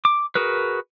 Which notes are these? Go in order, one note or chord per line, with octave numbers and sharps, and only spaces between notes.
D6
F#4 G#4 A#4 B4